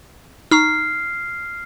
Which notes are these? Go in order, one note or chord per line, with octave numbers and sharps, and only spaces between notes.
D#4 A#5 C#6 F6 C7